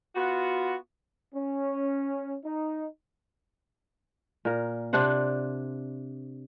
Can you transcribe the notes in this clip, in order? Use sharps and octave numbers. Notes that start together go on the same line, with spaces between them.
B3 F4 F#4
C#4
D#4
A#2 A#4
C3 D4 C5 F#5